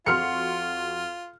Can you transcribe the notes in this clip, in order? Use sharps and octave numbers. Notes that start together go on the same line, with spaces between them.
F2 F4 F#4 C6 F6 C#7